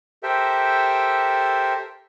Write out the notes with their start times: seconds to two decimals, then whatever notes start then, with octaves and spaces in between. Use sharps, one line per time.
0.23 G4 A4 A#4 C5 E5 G5